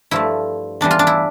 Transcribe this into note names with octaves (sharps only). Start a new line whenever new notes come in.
G2 F3 A3 E4
E2 E3 G3 D4
F4
D4
E4